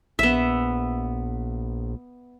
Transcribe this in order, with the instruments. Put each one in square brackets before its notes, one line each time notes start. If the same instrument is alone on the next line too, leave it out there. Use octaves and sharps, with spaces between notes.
[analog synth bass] A#1 [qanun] B3 E5